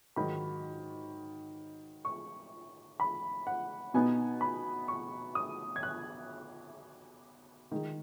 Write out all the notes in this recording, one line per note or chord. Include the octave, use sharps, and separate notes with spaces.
G#2 D#3 F#3 B5
C#6
B5
F#5
B2 B3 D#4 G#5
B5
C#6
D#6
G#6
F#6
D#3 G#3 D#4